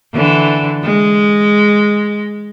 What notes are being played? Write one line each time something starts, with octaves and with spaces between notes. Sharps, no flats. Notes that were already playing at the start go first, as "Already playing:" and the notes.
D3 E3
G#3